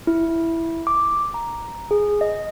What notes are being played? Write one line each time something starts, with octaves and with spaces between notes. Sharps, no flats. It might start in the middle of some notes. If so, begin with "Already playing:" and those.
E4
D6
A#5
G#4
D#5